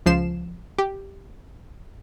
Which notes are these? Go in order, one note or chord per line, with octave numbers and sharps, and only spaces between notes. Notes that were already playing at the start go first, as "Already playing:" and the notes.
C#2 F3 C7 E7
G4